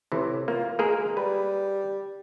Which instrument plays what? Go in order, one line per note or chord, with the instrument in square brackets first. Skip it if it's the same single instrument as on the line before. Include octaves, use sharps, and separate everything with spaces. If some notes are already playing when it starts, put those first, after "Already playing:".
[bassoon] A2 [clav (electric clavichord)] C3 E3
[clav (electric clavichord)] A#3 [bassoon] F4
[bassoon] G#3 [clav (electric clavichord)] A#3 G#4 A#4
[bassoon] G3 [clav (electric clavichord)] B4